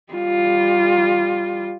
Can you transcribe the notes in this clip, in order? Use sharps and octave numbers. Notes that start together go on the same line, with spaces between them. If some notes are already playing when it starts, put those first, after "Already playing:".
G3 F4